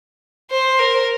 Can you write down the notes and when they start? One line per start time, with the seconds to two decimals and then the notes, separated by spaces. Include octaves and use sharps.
0.51 C5
0.79 A#4